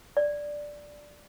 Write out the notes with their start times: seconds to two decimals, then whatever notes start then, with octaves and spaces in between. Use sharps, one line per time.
0.17 D5